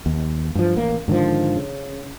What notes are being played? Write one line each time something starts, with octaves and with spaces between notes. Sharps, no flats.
D#2
G2 F3
A1 A#3
G#2 D3 D#3 F3
C#3